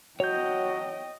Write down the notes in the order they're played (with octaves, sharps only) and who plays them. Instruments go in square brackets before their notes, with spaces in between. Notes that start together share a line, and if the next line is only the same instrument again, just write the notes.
[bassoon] F#3 [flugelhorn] F#4 [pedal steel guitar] C#5 G6 [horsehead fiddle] D#5 G5